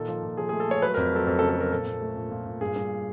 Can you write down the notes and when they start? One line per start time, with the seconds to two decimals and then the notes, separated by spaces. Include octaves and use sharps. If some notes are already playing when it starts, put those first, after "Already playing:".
Already playing: A#2 D#3 A4
0.08 F3
0.23 A#2
0.37 F3 G#4
0.49 G#4
0.53 A3
0.60 A4
0.68 A3 C#5
0.82 F#3 B4
0.94 A#4
0.97 F2
1.13 F#3 A4
1.27 F2 A4
1.39 A4
1.42 C#3
1.49 A4
1.57 F#3 A#4
1.72 A#2 A4
1.87 A#2
2.02 A3
2.16 A#2
2.31 A#2
2.46 A#2
2.61 G2 G#4
2.76 G2